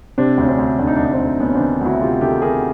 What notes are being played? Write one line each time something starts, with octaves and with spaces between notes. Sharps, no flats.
C3 C4 D4
D2
C#4
C4 D4
D2
D2 D4
D#4
D2 D4
D#4
C4 D4
D2
D2 B3 C#4
C#4
D#3 C4 D4
D2 E4 F#4
C3 F4 G4
D#3 G4 A4
C3 G#4 A#4